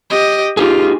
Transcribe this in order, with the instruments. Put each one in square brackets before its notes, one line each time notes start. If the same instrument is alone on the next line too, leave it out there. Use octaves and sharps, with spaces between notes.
[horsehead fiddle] G4 D#5
[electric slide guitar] D#4 G4 G#4 [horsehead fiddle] F4